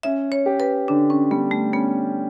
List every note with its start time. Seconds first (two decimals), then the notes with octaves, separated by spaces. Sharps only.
0.03 C#4 E5
0.32 C#5
0.46 G4
0.60 B4
0.88 D3 D4
1.10 C#4
1.31 G3 B3
1.51 A3
1.73 B3 C#4